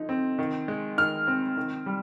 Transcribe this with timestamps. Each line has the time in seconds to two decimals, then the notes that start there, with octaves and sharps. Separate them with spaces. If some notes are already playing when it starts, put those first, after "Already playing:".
Already playing: D3 F3 D#4
0.09 C4
0.39 D#3
0.68 G#3
0.98 D#3 F6
1.27 C4
1.57 D#3
1.86 G3